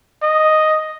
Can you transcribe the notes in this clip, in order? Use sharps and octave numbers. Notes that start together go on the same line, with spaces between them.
D#5